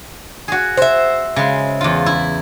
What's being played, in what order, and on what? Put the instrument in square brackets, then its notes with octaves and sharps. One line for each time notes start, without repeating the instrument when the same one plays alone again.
[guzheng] F#4 G#4
[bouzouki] C5 E5
[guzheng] C#3 G#3
E2 F4
E4